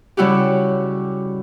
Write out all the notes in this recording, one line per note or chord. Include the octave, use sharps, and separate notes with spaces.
C#3 G3 E4 F#4 G4